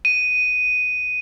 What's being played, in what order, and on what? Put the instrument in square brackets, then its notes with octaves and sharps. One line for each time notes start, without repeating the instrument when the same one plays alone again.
[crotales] D#7